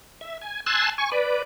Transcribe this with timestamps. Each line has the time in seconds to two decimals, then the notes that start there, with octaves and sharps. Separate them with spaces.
0.21 E5
0.41 G#5
0.66 G#5 A5 C6 E6 F#6
0.98 G#5 C#6
1.12 B4 D5